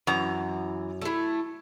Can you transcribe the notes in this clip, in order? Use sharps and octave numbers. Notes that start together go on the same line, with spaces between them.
F#2 E3 A#5
A3 E4